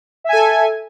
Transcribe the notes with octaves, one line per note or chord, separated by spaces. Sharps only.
A4 E5 G#5